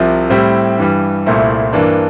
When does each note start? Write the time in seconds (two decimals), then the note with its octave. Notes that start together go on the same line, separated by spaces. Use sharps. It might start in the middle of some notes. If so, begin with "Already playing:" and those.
Already playing: C2 C3 F3
0.30 A2 G3 C4 E4 G4
0.79 G2 E3 G3
1.26 C2 A#2 A3 C4 E4
1.73 G2 E3 A#3 D4